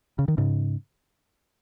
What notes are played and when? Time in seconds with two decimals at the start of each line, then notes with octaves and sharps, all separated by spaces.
0.19 C#3
0.28 D#3
0.38 G#2 C#3